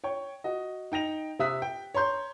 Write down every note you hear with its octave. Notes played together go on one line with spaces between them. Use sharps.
C#5 G5 C#6
F#4 D#5
D#4 G5 A#6 F7
C3 G4 E5 D#6 F#6 B6
G5
C#5 A#5 C6 G6